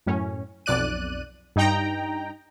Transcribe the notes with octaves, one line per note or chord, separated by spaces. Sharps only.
F#2 A2 C#4
B1 F2 D5 F#6 D#7
G2 D#4 G5 A#5